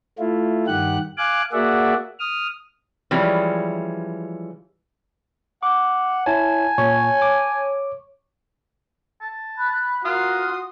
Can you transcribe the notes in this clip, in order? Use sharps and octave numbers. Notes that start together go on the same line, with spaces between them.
A3 E4 F4
G2 D#3 G4 F#5 F#6
F5 G#5 D6 F#6
A#3 F#4 G#4 D5 E5 F#5
D#6 F6
E3 F3 G3 G#3 C#4
F#5 D6
E4 C#5 G#5 A5
A#2 C#5
D6
A5
B5 F#6
F4 F#4 A#4 C6 D#6 F6 F#6